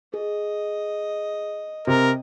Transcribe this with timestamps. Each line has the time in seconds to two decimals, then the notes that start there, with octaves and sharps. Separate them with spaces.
0.14 G#4 D#5
1.87 C3 A#4